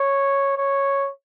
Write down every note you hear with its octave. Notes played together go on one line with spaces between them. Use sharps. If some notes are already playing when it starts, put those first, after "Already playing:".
Already playing: C#5
C#5